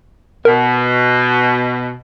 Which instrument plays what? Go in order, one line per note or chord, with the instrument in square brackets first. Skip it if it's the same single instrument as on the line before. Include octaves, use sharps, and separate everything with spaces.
[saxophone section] B2 [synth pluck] A#4